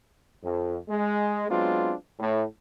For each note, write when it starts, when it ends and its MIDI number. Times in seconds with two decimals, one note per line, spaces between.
0.43 0.78 41
0.89 1.46 56
1.49 1.93 54
1.49 1.93 56
1.49 1.93 59
1.49 1.93 60
1.49 1.93 62
1.49 1.93 65
2.19 2.43 45